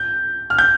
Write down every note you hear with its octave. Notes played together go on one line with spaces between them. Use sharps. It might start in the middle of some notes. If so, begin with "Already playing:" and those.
Already playing: G6
F6
G6